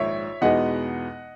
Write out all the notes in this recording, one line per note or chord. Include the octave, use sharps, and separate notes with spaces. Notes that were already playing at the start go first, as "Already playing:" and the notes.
Already playing: A#1 G#2 D#3 C#5 E5
E2 B2 G#3 B3 D#4 D#5 F#5